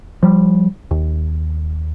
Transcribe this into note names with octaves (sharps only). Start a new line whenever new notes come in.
F3 G3
D#2